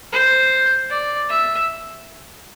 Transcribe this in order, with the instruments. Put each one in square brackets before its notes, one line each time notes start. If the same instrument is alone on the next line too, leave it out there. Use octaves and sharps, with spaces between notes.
[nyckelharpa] C5
D5
E5